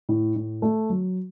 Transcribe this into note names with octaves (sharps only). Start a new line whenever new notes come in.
A2
A2
A3
F#3